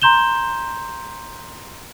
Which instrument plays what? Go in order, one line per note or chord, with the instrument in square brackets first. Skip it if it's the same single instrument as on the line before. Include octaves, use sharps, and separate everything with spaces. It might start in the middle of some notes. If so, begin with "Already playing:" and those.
[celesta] A#5 C6 G6 E7 G7